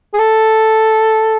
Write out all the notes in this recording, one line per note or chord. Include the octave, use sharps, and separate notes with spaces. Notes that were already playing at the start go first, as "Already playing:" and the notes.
G#4
A4